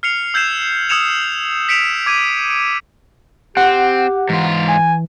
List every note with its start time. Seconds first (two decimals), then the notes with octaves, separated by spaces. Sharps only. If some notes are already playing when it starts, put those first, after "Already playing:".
0.03 F6 C7 C#7 F7
0.34 E6 G6 G#6 C7 E7
0.89 D#6 E6 G#6 C#7 E7 F7
1.69 B6 C#7 D7 E7 F7
2.06 D6 G#6 D#7
2.51 D7
3.57 C4 G4 F#5
4.29 G#2 E3 F4
4.68 G#5